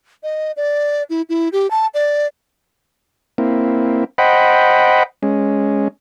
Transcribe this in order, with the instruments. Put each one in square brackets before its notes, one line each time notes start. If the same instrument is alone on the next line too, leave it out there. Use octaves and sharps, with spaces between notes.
[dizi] D#5
D5
E4
E4
G4
A5
D5
[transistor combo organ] A#3 C4 E4
C5 D#5 F#5 G5 B5
G#3 C#4